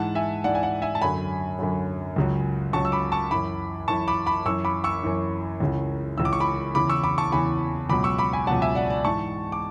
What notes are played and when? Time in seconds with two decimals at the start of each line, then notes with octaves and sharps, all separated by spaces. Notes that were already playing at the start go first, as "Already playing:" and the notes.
Already playing: G#2 E3 F#5 A5
0.15 E5 G#5
0.44 G#2 E3 D5 F#5
0.55 G#5
0.63 D5 F#5
0.82 E5 G#5
0.95 A5
1.02 F#2 D3 F#3 G#5 B5
1.59 F#2 D3 F#3
2.16 C#2 C#3 F#3
2.73 C#2 C#3 F#3 A5 C#6
2.85 E6
2.92 B5 D6
3.12 A5 C#6
3.31 F#2 E3 B5 D6
3.88 F#2 E3 A5 C#6
4.08 B5 D6
4.26 B5 D6
4.45 F#2 E3 C#6 E6
4.64 B5 D6
4.84 C#6 E6
5.04 F#2 E3
5.60 C#2 C#3 E3
6.17 C#2 C#3 E3 E6
6.25 D6
6.33 C#6
6.40 B5 D6
6.75 E2 C#3 E3 B5 D6
6.89 C#6 E6
7.04 B5 D6
7.18 A5 C#6
7.32 E2 C#3 E3 G#5 B5
7.89 C#2 B2 F#3 B5 D6
8.04 C#6 E6
8.18 B5 D6
8.33 G#5 B5
8.47 C#2 B2 F#3 F#5 A5
8.62 E5 G#5
8.75 D5 F#5
8.90 D5
9.04 G#2 E3 A5 C#6
9.52 D6